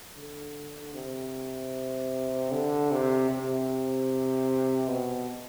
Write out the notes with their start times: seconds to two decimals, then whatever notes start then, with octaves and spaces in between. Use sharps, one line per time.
0.16 D3
0.94 C3
2.51 D3
2.91 C3
3.30 C3
4.88 B2